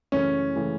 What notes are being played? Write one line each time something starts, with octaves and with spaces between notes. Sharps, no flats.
F#2 C#3 E3 A3 C#4
C#3 E3 A3